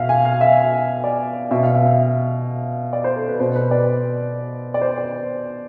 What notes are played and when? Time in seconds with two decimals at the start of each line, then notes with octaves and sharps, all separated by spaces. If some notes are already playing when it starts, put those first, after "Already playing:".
Already playing: B2 E5 F5
0.09 G#5
0.25 F5
0.41 E5
1.04 D5
1.51 B2 E5
1.63 F5
1.75 E5
1.86 E5
2.93 D5
3.04 C5
3.16 A4
3.28 B4
3.40 B2 C5
3.55 B4
3.71 D5
4.74 D5
4.81 C5
4.97 D5